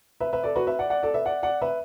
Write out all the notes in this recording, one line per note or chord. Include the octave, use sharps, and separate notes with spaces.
B4 E5
B4 E5
A4 D5
F#4 B4
B4 E5
D5 F#5
D5 F#5
A4 D5
B4 E5
D5 F#5
D5 F#5
B4 E5